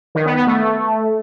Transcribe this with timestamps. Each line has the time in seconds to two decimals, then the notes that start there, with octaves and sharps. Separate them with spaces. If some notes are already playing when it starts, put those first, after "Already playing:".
0.15 D#3
0.26 B3
0.36 B3
0.47 A3